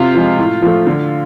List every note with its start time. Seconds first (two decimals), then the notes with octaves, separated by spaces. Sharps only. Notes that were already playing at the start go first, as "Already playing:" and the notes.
Already playing: C3 F4
0.14 F3 G#3
0.38 A2
0.62 F3 A3
0.87 D3